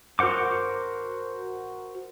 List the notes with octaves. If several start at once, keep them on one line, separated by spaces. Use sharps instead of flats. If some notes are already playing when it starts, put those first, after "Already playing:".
F#4 A#4 C5 F#5 D6